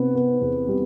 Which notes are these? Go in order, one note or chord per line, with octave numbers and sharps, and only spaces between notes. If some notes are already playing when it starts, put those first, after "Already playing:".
Already playing: C3 B3
B3
E2
G3